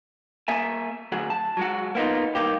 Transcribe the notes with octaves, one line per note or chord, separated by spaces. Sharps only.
A#3 E5 G#5
D2 F#3 G#4 F#5
A5
F#3 G#3 F#4
A#3 B3 D#4 F4
C2 D#3 A#3 G4